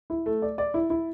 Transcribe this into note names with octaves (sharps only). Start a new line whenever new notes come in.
E4
A3
D5
D5
E4
E4